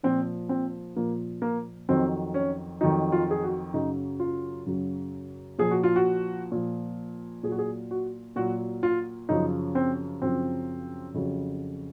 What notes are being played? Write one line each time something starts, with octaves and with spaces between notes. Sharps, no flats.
A#2 F3 C4
C4
A#2 F3 A#3
A#3
F2 D#3 F#3 C4
C#4
F2 D#3 F#3 D#4
F4
G#4
F#4
F#2 C#3 F#3 D#4
F4
F#2 C#3 F#3
A#2 F3 G#4
F#4
F4
F#4
A#2 F3
A#2 F#3 F#4 G#4
G#4
F#4
A#2 F#3 F#4
F4
F#2 C#3 F3 D#4
C4
F#2 C#3 F3 C4
F2 C#3 F#3